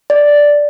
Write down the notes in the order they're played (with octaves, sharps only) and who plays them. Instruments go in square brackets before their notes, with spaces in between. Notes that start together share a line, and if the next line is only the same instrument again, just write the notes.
[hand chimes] D5